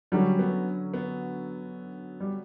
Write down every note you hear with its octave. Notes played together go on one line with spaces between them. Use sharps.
D3 F#3 G3 C#4
B3
B3
G3